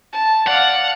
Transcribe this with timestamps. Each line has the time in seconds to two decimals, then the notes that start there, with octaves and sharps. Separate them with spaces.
0.12 A5
0.47 D5 F5 F#5